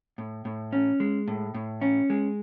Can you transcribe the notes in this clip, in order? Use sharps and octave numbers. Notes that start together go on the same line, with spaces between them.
A2
A2
C#4
G#3
A2
A2
C#4
G#3